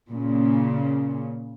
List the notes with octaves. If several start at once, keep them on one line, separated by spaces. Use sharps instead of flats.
A#2 C#3